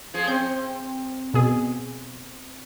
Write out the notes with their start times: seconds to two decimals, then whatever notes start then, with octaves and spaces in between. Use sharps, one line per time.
0.14 F3 G#4
0.27 C4 G6
1.34 B2 G#4